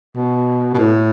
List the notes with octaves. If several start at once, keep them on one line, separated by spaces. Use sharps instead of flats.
B2
B2
A2